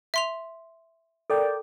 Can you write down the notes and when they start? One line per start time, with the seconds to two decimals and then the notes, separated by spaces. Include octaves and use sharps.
0.14 E5 C6 F7
1.30 A4 A#4 D5 G5